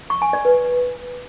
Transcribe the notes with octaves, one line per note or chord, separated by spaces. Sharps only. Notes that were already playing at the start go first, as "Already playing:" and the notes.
C#6
G#5
D5
B4